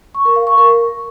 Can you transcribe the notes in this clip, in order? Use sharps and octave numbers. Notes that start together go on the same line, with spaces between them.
C#6
A#4
F5
C#6
A#4